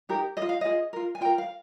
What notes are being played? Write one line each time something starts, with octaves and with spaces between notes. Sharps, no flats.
D#4 G4 A#4
G#4 D#5
F4
F5
F4 G#4 D#5
F4 A#4
G#5
F4 A#4 G5
F5